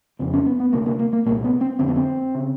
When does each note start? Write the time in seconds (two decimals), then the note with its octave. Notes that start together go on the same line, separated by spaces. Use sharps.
0.19 F2 C#3 C4
0.34 C#4
0.46 B3
0.60 B3
0.73 D2 C3 A#3
0.86 A#3
0.99 A#3
1.13 A#3
1.26 C2 A#2 A#3
1.44 B3
1.61 C4
1.79 F2 D3 C4
1.88 B3
1.96 C4
2.35 C#3